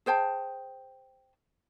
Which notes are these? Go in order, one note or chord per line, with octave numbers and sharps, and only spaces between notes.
G#4 C5 G5 A5